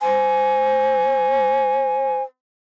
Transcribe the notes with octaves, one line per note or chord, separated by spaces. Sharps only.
C5 G#5